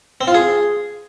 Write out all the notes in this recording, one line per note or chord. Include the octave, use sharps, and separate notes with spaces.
C4
F4
G#4